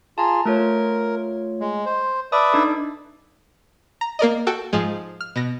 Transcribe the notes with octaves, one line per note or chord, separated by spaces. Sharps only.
F4 G#4 A5 A#5
A3 F4 A#4 C#5
G#3
C5
B4 D5 E5 A5 D#6
D4 D#4 A4
A#5
A#3 A#4 D5 D#5
F#4 A4 G5
G#2 F3 G#3
F6
B2 A#6